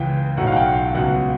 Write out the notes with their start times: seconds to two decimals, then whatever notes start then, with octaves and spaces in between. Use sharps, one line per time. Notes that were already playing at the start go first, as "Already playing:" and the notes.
Already playing: C#2 C#3 E3 G5
0.37 B1 A2 F#3 F#5
0.47 F5
0.52 F#5
0.56 G5
0.95 C#2 B2 F#3 F#5